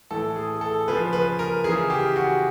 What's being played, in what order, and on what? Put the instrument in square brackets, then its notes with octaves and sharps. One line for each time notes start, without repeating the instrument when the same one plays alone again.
[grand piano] A2 E3 A4
G#4
A4
C#3 F3 B4
B4
A#4
E3 G#4
C#3
G4
F#4